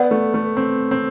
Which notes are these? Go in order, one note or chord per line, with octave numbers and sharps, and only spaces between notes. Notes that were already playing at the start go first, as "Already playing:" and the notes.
Already playing: B3 B4 D5 F#5
A3
A3
C4
C4